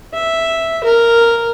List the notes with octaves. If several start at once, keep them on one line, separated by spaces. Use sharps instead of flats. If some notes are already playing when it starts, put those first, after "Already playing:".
E5
A#4